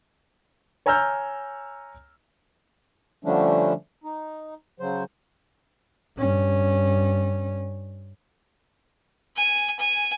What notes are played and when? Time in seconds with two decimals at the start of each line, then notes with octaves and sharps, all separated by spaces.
0.86 C#5 G#5 A#5 E6 F6 G6
3.25 D3 F3 G3 A3 C#4 D4
4.04 D#4
4.80 C#3 F#3 C5
6.18 G2 C#4
9.36 G#5
9.79 G#5